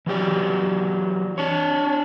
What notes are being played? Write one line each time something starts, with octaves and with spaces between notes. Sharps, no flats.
E3 F#3 G4 D5
D4 C#5